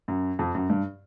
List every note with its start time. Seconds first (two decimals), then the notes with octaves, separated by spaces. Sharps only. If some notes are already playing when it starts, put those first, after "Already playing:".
0.08 F#2
0.39 F2
0.55 F#2
0.70 G2